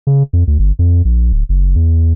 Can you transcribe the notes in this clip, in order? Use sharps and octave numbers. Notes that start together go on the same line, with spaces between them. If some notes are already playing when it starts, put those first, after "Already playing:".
C#3
F2
D2
G1
F2
A#1
D1
F#1
E2